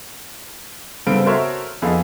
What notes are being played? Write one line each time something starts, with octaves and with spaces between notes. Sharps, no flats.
G2 C#3 B3 C4 A4 D7
F#4 A4 A#4 C5 C#5 E5
F2 B3 G#4 A4 D#5 F5